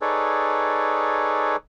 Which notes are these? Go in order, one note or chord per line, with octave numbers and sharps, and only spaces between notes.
D#4 G#4 A4 B4 C#5 D5